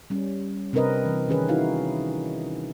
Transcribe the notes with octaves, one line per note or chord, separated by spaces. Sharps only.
G3 C#4
C3 C4 D4 A#4 B4 D#5
E3
D#3 C#4 G#4 B4
D#4 E4 F#4 F5